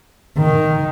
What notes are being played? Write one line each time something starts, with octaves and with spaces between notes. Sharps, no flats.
D#3